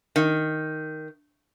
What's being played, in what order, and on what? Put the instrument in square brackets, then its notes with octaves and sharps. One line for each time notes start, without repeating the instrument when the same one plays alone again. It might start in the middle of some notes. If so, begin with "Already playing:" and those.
[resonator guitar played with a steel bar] D#3